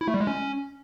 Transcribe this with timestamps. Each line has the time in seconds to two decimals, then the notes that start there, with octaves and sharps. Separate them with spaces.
0.01 E4
0.07 A3
0.14 G3
0.21 G#3
0.27 C#4